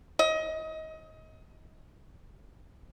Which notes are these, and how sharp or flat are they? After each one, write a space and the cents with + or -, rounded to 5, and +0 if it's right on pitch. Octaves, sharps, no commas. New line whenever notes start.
D#5 +25